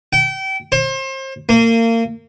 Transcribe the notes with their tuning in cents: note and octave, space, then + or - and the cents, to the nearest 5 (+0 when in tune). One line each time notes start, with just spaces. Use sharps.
G5 -30
C5 +35
A#3 -30